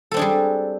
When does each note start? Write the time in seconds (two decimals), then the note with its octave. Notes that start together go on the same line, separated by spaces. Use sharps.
0.11 A4
0.14 C4
0.17 D4
0.19 G#4
0.22 G3